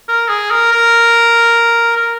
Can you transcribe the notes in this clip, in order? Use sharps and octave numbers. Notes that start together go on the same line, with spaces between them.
A#4
G#4
A#4
A#4
A#4